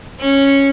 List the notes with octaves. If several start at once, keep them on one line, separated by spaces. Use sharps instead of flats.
C#4